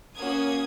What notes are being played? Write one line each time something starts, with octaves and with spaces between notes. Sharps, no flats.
A#3 C#4 F#4 D#6 G#6